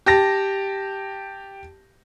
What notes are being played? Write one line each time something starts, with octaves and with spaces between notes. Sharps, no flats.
G4 A5 A#6